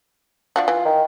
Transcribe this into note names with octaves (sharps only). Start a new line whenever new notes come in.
F3 D4 F4 F#4
E3
D#3